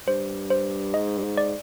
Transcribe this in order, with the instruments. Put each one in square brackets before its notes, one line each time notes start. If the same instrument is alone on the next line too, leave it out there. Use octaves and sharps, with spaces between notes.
[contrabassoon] G2 [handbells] C5
[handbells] C5
[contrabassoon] G#2 [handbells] D#5
[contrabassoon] G2
G#2
[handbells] D5